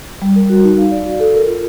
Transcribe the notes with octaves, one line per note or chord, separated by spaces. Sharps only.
G3
A#4
F#4
D#4
F5
D5
F#4
A4
A#4
F4